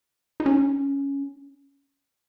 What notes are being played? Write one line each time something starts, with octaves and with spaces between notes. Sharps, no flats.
D#4
C#4